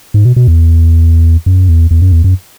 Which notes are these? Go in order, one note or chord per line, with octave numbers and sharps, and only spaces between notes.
G#2
B2
B2
E2
F#2
E2
E2
F#2
E2
F#2